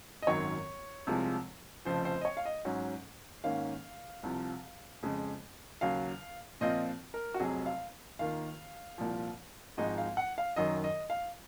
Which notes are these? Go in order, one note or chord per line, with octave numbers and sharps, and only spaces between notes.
D#5
G#1 F#2 D#3 F#3 C#5
C2 C3 F3 G#3
F1 F2 C#3 F3 C5
C5
D#5
C#5
F5
D#5
G#2 F#3 C#4
G#2 D#3 A#3 C#4 F5
C2 C3 F3
F2 C#3 G#3
D#2 C#3 F#3 F5
A#2 F3 C4 F4 D#5
A#4
F#4
F1 F2 C3 F#3 G#4
F5
D#2 D#3 A#3 F4 F5
C2 A#2 F3
G#1 G#2 F3 G#3 D#4 D#5
F5
F#5
F5
F#2 D#3 F#3 D#5
D#5
F5